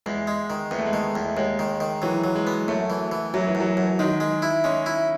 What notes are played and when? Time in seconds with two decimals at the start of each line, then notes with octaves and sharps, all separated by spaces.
0.06 E2 G#3
0.27 G#3
0.50 D#3
0.71 E2 B3
0.79 A3
0.86 G#3
0.93 D#3 A3
1.15 E2
1.37 D#2 G#3
1.59 D#3
1.80 D#3
2.02 E3 F#3
2.24 F#3
2.35 G#3
2.47 B3
2.68 F#2 A3
2.90 E3
3.12 E3
3.34 F#2 F#3
3.47 E3
3.55 F#2
3.60 F#3
3.77 F#2
3.99 D#3 G#3
4.20 G#3
4.42 E4
4.64 G#3 C#4
4.86 E4